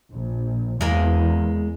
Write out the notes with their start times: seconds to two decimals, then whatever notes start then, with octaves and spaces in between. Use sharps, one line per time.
0.11 A#1
0.81 E2 G#3 A#3